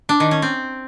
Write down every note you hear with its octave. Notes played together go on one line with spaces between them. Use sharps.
D4
D#3
C#4
C4